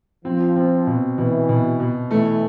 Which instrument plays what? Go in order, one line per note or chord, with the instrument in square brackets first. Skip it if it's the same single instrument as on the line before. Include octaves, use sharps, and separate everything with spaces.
[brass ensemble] F3 [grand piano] C4
[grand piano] C4
B2
[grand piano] B2 [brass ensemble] E3
[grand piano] B2
B2
[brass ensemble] E3 [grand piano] A3